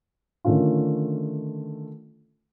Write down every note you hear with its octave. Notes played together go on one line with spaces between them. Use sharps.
D3 D#3 A3 C#4 F4